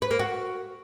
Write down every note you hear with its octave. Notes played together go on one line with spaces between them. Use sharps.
B4
A#3
F#4